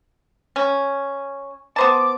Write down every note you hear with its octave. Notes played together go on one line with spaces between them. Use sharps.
C#4
B3 C5 A5 D6